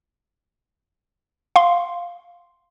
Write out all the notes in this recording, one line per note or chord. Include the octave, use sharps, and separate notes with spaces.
F5 C6